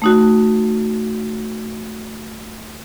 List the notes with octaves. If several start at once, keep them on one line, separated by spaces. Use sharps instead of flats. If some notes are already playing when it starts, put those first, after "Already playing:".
A3 D#4 F#4